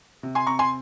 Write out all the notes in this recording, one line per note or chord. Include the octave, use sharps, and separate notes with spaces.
C3
G#5 C6
C4 A#5 C#6
G#5 C6